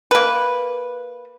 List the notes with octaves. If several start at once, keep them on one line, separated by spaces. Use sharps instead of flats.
A#3 B4